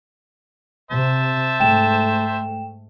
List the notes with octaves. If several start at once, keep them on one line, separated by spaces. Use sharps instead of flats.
C3 C5 E5 A5
G#2 A3 G5 E7